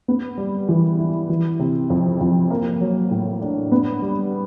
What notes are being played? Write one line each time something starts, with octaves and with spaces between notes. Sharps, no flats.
B3
G3
E3
E4
E3
C3
F2
F2
A#3
F#3
A2
D4
B3
G3